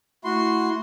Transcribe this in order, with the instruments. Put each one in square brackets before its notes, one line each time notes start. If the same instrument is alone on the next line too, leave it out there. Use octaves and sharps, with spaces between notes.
[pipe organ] A3 E4 [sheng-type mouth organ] F#4 C6